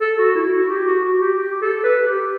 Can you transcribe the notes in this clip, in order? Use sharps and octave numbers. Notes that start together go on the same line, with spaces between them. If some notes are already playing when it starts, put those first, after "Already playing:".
A4
F#4
E4
E4
F#4
G4
F#4
F#4
G4
G4
A4
B4
G4